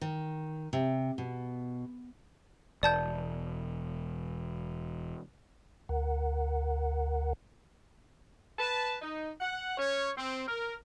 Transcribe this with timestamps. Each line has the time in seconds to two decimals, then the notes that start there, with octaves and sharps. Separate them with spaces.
0.01 D#3
0.73 C3
1.18 B2
2.83 E1 D5 A5 G6
5.89 D2 A#4 F#5
8.59 B4 A5
9.01 D#4
9.40 F#5
9.77 C#4 C#5
10.16 C4
10.48 A#4